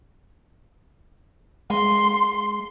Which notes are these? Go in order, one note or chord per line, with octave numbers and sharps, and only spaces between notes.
G#3 C6